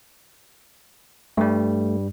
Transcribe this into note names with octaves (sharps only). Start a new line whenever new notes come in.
G2 G3 A3